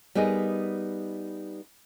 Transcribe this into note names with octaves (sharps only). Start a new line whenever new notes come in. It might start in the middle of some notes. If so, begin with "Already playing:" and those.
G3 B3 D#4 G#4 A#4 D#5